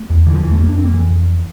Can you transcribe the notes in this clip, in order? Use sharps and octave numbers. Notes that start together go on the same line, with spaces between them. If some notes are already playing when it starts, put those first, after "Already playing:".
Already playing: A3
E2
D3 E3
F3
E2 E3
A3
F2 A#3
D4
F2 C4
A#3
F2 E3
F2